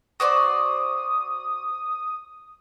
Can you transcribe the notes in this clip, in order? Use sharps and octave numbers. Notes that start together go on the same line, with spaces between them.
F#4 C5 D5 D#6